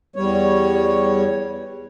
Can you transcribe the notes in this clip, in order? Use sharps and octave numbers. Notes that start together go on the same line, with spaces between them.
E2 G3 C#5